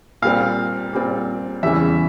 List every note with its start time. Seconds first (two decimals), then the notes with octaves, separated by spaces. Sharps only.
0.22 A#2 G3 C4 F5
0.93 A#2 G3 C4
1.63 E2 C#3 E3 G3 E5